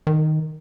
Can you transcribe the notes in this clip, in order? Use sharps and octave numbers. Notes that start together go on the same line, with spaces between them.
D#3